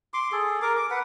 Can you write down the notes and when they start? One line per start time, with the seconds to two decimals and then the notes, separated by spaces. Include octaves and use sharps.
0.14 C6 D6
0.32 G#4 A4
0.62 A#4 D6
0.76 D6
0.91 B4 F#5